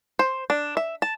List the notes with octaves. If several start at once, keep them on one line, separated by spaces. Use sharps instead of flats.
C5
D4
E5
A5